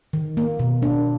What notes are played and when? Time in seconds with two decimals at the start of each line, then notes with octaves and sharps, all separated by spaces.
0.13 D#3
0.37 A#3
0.59 B2
0.82 A#3 D4